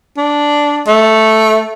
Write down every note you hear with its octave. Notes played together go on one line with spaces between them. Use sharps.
D4
A3